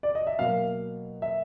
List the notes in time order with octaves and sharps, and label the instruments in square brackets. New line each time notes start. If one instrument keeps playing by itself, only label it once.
[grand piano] D5
D#5
E5
B2 F#3 A#3 F5
E5